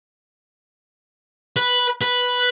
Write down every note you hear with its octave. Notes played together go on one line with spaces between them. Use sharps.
B4
B4